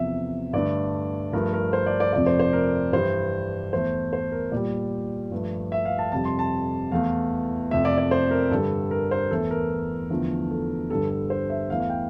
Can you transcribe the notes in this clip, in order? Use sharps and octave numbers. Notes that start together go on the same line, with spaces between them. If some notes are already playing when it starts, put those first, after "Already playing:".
Already playing: E2 C3 F3 E5
G2 D3 A3 D5
G2 F3 A3 A#4
A#4
C5
D5
D5
F2 C3 F3 A3 D5
C5
C5
A#4
G2 E3 G3 C5
E2 E3 A3 C5
C5
A#4
A#2 G3 D5
G2 F3 A3
E5
F5
A5
F2 C3 G3 A5
C6
A5
E2 E3 A3 F5
F2 C3 F3 A3 E5
D5
D5
C5
A#4
G2 D3 G3 A4
A#4
C5
E2 E3 A3 A4
A#4
E2 D3 F3 A3
A4
G2 D3 G3 A4
A4
C5
E5
E2 E3 A3 F5
F5
G5